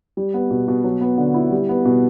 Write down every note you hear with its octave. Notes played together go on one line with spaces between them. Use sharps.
G3
B3
B2
B2
F#3
B3
D3
E4
G3
B3
B2